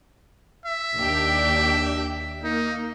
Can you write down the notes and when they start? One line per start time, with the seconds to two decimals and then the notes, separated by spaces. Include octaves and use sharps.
0.66 E5
0.97 D#2 D4 G4
2.44 A#3 D#4